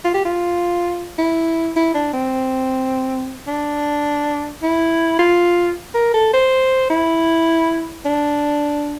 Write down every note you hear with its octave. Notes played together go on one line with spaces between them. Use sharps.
F4
G4
F4
E4
E4
D4
C4
D4
E4
F4
A#4
A4
C5
E4
D4